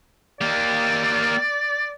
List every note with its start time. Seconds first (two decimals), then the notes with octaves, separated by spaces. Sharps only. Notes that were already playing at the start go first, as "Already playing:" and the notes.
0.41 A#3 G4 D5